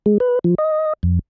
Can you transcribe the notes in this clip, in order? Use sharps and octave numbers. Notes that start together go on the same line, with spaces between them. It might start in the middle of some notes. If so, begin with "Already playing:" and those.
G#3
B4
F3
D#5
F2